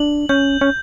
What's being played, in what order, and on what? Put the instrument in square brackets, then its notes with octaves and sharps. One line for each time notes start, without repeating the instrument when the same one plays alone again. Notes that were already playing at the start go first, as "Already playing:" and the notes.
Already playing: [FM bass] D4 [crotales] F#7
[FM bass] C#4 [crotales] G6
[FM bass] C#4